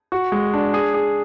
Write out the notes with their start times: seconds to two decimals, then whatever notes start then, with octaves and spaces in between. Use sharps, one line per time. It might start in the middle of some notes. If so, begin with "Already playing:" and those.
0.12 F#4
0.32 G#3
0.53 D4
0.74 G#4
0.94 G#4